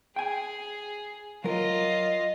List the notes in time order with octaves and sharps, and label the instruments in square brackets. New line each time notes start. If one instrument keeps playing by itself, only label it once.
[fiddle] G#4 [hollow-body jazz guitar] G5 G#5
[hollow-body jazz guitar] F#3 A#4 [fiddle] F4 D#5